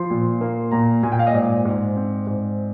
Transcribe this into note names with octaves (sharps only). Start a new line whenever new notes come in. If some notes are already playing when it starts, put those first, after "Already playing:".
Already playing: F3 C6
A#2
A#3
A#2 A#5
A#2 G#5
G5
F5
D#5
G#2 D5
G#2
C4
G#2